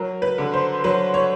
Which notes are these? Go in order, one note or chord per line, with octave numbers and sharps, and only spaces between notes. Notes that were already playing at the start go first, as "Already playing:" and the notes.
Already playing: F#3 A#4
B4
D3
C5
F#3 B4
C#5